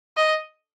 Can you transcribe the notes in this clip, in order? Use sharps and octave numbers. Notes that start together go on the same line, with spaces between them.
D#5